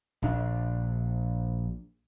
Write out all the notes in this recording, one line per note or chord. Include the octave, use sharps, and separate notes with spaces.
A#1 D4